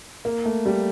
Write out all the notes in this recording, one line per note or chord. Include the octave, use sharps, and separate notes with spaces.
A#3
A3
G3